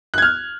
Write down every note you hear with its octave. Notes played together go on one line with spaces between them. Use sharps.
F6 F#6 G#6